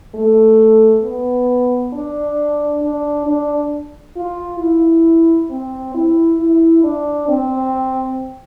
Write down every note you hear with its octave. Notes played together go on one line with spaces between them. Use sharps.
A3
B3
D4
D4
D4
F4
E4
C4
E4
E4
D4
C4